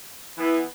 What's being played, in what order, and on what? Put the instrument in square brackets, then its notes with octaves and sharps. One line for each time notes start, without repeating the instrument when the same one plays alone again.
[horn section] E3 B3 E4